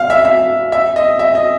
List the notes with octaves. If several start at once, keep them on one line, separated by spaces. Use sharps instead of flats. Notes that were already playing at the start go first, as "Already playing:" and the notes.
Already playing: F5
E5
E5
E5
D#5
E5
D#5